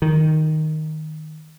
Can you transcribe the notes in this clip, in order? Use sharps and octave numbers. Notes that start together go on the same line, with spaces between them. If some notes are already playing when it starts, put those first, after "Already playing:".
D#3